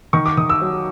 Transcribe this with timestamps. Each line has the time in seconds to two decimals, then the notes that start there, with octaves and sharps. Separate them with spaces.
0.13 D#3 C#6
0.26 D6
0.37 D#3 D#6
0.50 E6
0.61 F#3